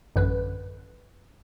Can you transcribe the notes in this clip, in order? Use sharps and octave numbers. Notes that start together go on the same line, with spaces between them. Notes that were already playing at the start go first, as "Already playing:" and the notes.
A1 F#2 D3 B4